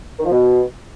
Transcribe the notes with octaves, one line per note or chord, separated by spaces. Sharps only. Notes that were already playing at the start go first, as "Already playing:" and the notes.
D#3
F3
B2